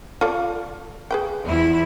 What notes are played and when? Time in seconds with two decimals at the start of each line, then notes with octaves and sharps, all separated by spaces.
0.21 F4 A4 D5
1.11 G#4 B4 G5
1.44 E2 F3 E4